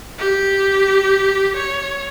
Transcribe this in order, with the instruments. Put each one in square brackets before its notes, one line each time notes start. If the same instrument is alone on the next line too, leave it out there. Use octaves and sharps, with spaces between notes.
[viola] G4
C#5